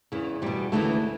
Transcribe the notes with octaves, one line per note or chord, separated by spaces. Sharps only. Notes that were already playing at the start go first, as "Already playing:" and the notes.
E2 C#3 E3
E2 B2 G3
D2 C#3 E3 A3